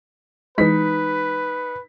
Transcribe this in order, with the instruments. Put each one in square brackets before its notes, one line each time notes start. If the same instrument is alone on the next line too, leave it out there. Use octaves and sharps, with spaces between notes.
[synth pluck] E3 G#3 [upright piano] D#4 B6 [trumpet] B4